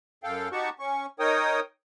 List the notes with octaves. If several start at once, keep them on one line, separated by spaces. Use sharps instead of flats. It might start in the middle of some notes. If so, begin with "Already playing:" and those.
F#2 A4 F5 G5
D#4 F#4 G4 F#5 A5 C#6
C#4 C#6
D#4 A#4 C#5 G5 D#6